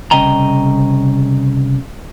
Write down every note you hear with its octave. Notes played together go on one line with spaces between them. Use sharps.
C2 C#3 D#5 G5 A#5